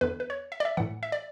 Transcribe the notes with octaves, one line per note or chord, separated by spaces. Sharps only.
E2 D3 B4
B4
C#5
E5
D5
E5
A2 E3 F#5
E5
D5